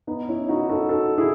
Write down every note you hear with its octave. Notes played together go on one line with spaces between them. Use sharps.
B3 D#4
C#4 E4
D#4 F#4
F#4 A4
F#4 A4
E4 G#4